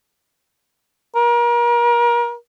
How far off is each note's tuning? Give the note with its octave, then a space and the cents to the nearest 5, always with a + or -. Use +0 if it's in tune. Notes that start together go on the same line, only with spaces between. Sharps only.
A#4 +35